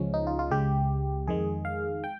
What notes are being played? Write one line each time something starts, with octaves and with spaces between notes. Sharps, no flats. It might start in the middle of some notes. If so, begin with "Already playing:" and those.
Already playing: C#2 C#3 F3 G#3 C#4
D#4
F4
F4
C#2 C#3 G#3 G4
F2 D#3 G#3 G#4
F5
G5